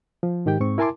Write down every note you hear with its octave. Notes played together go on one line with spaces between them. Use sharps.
F3
G#2 D#3 G4 G5
G#2 C4 C#6
E4 A#4 G#5 A5 C6 D6